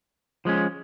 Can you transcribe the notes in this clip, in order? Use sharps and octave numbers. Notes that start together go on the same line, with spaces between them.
F3 G#3 C#4